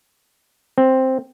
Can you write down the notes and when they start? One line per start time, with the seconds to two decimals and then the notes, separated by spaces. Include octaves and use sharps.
0.78 C4